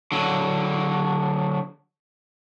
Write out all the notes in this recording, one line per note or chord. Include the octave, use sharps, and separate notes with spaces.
D3 F#3